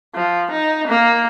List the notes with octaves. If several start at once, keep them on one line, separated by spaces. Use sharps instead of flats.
F3
D#4
A#3